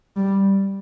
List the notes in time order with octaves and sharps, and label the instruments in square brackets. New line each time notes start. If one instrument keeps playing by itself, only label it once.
[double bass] G3